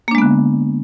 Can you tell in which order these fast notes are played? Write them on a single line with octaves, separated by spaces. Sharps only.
A#3 D4 G#3 B3 D3